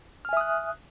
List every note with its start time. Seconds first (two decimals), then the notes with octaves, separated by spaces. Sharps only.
0.25 F6
0.29 G#5
0.33 E5
0.37 D#6
0.41 F#6